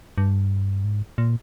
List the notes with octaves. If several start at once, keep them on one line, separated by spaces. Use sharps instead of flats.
G2
G#2
A#2